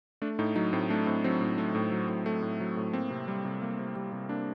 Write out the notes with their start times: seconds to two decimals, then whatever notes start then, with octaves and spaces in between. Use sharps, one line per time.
0.22 A3 D4
0.39 A2 D#4
0.56 F#3 D#4
0.73 A2 C4
0.90 A3 D4
1.06 A2 C4
1.24 F#3 C4
1.41 A2
1.58 A3
1.75 A2
1.92 F#3
2.09 A2
2.26 A3
2.42 A2
2.60 F#3
2.77 A2
2.93 A#3 C4
3.10 C3
3.28 G3
3.45 C3
3.62 A#3
3.79 C3
3.96 G3
4.13 C3
4.29 A#3 D4